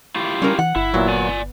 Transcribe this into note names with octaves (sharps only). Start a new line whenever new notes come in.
E4 F4 G4
G3 C#4 A#4
E3 F#5
G1 E4
A#2 F#3 B3
D5 G#5